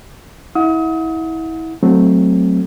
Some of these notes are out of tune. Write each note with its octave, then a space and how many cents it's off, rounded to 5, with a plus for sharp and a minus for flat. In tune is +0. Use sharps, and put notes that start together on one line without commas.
E4 -30 F#5 -35 D#6 +35
F#3 +10 A3 +0 C4 +0